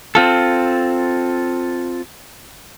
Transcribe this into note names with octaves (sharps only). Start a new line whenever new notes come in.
C4 F4 A4